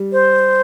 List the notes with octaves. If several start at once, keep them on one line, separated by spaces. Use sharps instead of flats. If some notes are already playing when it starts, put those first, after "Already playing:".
Already playing: G3
C5